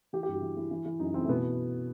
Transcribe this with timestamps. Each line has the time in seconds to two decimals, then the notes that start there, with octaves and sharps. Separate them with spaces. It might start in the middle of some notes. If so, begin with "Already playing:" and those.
0.13 E3 G4
0.23 G4
0.28 G2 F#4
0.42 E3
0.57 E3
0.71 E3
0.86 E3
1.00 F#2 D#4
1.14 E3 C4
1.24 A3
1.29 B2 B3